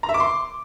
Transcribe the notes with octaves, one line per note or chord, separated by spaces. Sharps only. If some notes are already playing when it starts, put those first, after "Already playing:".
A#5
E5
D6
C6